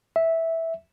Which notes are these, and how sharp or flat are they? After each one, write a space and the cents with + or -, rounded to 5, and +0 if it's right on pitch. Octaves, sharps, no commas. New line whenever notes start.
E5 -10